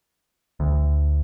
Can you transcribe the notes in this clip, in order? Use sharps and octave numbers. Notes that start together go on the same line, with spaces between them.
D2